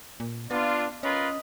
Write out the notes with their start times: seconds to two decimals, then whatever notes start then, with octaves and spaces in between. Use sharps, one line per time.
0.20 A#2
0.51 B3 D4 F4
1.03 C#4 F4 A#4 B4 D#5